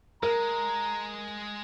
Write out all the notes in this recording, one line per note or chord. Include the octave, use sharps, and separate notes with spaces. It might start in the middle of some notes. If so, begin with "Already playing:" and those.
G#3 A#4 A#5